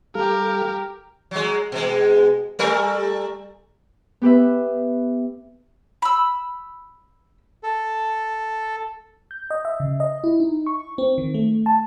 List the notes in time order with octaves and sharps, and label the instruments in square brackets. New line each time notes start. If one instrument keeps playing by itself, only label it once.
[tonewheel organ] G3 A4 F5 [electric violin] G4 A#4
[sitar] F#3 G#3
B2 G#3
G3 A3 A#4
[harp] B3 G4 B4 E5
[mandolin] B5 E6
[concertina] A4
[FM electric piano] G6
D#5
E5
C#3
D#5
E4
D#4
C#6
C4
D#3
A3
A5